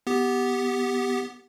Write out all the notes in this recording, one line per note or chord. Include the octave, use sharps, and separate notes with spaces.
B3 G4